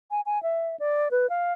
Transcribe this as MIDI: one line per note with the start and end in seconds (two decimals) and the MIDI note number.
0.11 0.21 80
0.26 0.41 80
0.43 0.76 76
0.80 1.08 74
1.11 1.29 71
1.30 1.53 77